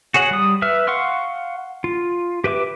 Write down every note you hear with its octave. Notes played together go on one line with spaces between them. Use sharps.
F#4 G#4 C#5 F#5
G3 D#6
B4 E5 E6 F6
F5 F#5 C6 C#6 F6
F4
G4 B4 E5 D6